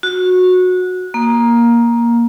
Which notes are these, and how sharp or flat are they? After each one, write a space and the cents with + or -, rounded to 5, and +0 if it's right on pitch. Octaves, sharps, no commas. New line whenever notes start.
F#4 -20
A#3 +10